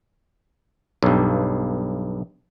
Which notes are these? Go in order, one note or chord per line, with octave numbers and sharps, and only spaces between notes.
B1 G2